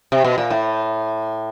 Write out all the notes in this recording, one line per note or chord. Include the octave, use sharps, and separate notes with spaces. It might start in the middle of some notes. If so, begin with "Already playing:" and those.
C3
B2
A#2
A2